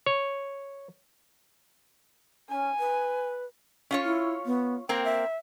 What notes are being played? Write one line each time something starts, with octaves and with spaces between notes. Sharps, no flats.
C#5
C#4 G#5
B4
C#4 F4 C#5
E4
B3
A#3 C4 A#4 G5
E5